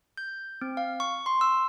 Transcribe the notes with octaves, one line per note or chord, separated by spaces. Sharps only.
G6
C4
F5
C#6
C6
E6